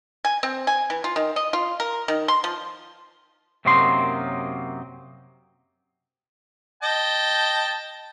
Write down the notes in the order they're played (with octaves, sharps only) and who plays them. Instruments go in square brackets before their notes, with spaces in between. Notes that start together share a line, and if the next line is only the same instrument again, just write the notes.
[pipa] G#5
C4
G#5
E3
F4
D#3
D#5
F4
A#4
D#3
C6
F3
[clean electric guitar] F#2 C3 F#3 A#3 D#4 C6
[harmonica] D#5 G5 A5